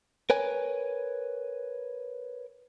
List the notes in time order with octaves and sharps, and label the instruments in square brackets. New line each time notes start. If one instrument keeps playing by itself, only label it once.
[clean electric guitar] A#4 B4 C#5 G#5